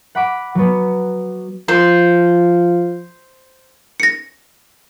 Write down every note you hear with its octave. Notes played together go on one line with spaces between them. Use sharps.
F#5 B5 D6
F#3 B3
F3 C5
A#6 C#7